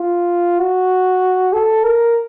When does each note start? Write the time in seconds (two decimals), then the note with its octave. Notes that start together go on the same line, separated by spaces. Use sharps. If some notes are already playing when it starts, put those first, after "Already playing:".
Already playing: F4
0.59 F#4
1.53 A4
1.84 A#4